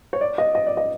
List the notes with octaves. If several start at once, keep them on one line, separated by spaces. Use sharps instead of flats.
C#5
D5
D#5
D#5
D5
D#5